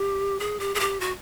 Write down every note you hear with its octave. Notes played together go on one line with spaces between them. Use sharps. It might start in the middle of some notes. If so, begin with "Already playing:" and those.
Already playing: G4
G#4
G4
G#4
G4
F#4